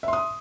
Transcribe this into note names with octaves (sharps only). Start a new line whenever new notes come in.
E5 C6 D#6